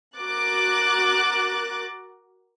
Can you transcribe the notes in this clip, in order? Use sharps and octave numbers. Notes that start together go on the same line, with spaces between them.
F#4 A#4 D6 F#6 A6